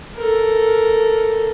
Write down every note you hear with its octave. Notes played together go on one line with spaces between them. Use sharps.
A4 A#4